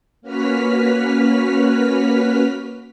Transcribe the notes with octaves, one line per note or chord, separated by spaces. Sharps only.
A#3 C#4 F#4 B4 F6 B6